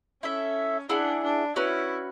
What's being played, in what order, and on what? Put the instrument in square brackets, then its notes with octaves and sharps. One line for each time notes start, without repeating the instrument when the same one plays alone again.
[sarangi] C#4 [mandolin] E4 A4 E5
[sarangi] D4 [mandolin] E4 G#4 D5 F#5
[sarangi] D4
[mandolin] C#4 F#4 B4 [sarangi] E4